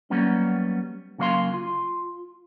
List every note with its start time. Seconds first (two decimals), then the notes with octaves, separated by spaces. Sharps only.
0.10 F#3 G3 A#3 B3 C#4
1.18 C#3 F#3 A#3 F5 C6
1.54 F4